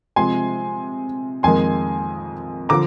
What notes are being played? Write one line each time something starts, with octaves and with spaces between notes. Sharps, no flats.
C3 F3 G#3 G#5 C6
F2 D#3 G#3 G#5 C6
D3 F3 A#5 D6